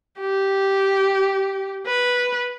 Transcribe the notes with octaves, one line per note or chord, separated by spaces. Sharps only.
G4
B4